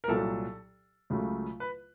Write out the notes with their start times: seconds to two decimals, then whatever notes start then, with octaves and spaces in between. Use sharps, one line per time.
0.04 A#4
0.08 C2 A#2 F#3 A4
1.10 C#2 C#3 F#3 A3
1.60 B4